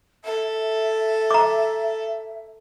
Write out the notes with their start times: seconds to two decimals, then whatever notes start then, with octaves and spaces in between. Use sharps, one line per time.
0.25 A4 E5
1.31 A#5 D6